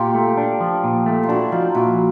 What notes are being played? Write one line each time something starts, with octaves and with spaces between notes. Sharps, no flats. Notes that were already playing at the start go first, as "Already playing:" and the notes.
Already playing: A#2 F4 G4
A3
D4
F3
A#2
A3
F4
D4 E4 F#4
F3 D#4 F4
A#2 E4 F#4